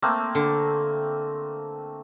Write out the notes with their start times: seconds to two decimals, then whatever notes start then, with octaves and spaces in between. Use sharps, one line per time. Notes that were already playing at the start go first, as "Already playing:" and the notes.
0.02 A3 A#3 C4
0.35 D3